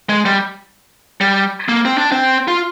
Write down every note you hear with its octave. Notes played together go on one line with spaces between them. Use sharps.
G#3
G3
G3
A#3
C4
D4
C4
F4